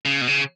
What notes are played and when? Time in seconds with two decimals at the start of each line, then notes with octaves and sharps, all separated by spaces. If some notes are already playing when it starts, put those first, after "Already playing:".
0.05 C#3
0.21 B2
0.28 C#3